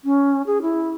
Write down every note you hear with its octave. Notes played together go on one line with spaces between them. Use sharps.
C#4
G#4
E4